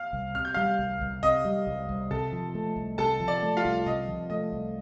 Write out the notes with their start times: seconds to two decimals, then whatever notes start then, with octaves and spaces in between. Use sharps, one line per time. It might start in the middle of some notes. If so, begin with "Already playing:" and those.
Already playing: F5 F6
0.13 C2
0.35 C3 F6
0.45 G6
0.54 G3 F5 F6
0.79 C2
1.01 C2
1.23 C3 D#5 D#6
1.45 G3
1.67 C2
1.89 C2
2.11 C3 A4 A5
2.33 F3
2.55 A3
2.76 C2
2.98 C3 A4 A5
3.20 F3
3.28 D5
3.42 A3
3.57 F4 F5
3.65 C2
3.86 C3 D#5
4.08 F3
4.30 A3 D#5
4.52 C2